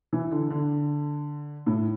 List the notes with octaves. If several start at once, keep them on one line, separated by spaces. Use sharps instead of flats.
E3
D3
D3
A2